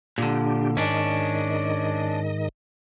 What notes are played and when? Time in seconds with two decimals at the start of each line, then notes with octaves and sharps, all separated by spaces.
0.18 A#2 D3 D4 G4
0.77 G#2 D#3 C#4 D4 D#5